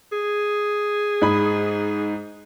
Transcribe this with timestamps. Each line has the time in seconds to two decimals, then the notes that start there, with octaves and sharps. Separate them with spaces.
0.12 G#4
1.22 G#2 B5